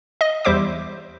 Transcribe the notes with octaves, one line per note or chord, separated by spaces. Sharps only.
D#5
E2 G3 C5 E5 D6